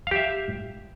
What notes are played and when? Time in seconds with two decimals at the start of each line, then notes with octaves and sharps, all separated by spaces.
0.07 F5
0.11 G4
0.16 E5